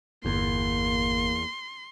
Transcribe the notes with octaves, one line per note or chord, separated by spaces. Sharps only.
G1 E2 A#3 C6